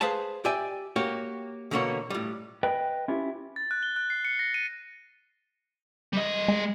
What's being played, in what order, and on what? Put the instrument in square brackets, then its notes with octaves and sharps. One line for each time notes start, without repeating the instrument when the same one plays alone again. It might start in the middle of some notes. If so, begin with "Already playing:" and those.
[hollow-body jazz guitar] G#4 B4 C5 F5 A5
G4 D5 E5 G5 G#5
A#3 F#4 G4 C#5
B2 D3 E3 A#3 F#4 C#5
A2 G3
[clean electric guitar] B4 D#5 G5
C#4 E4 F4 G4
[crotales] A6
F#6
G7
F#6
C7
C#7
A#6
D#7
[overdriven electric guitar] G3 D#5
[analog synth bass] G#3